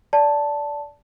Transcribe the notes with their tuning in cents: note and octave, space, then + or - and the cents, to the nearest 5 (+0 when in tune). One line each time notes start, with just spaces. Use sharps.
D5 -15 A5 +0